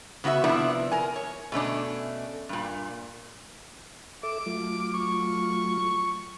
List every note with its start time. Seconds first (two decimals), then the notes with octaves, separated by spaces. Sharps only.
0.24 C#3 B3 F#4 C5 E5
0.44 C3 F3 B3 D4 E4
0.92 A#4 G#5
1.16 C#5
1.52 B2 A3 C#4 D4
2.49 G2 A#2
4.23 A4 E5 D6
4.46 F#3 A3 F4
4.94 C#6